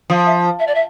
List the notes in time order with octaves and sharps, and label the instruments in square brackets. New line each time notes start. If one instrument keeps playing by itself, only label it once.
[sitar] F3 [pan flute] F5
[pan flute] E5
E5
D5
E5